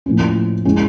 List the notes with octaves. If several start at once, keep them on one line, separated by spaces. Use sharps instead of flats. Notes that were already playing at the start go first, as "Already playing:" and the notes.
A2 F3 A#3 C#4
G#3 C#4 E4